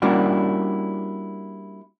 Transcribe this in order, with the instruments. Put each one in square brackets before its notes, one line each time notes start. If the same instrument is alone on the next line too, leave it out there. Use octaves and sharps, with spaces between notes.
[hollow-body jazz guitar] G3 A#3 C#4 D4 E4 F#4